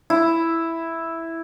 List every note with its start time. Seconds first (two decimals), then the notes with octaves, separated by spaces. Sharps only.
0.10 E4